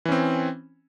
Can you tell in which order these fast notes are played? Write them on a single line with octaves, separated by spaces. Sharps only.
E3 C#4 C4